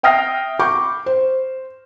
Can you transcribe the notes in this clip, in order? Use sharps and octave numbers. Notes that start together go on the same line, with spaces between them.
E5 G5 D#6 F6 A#6 C7
B5 C#6 D6 G6
C5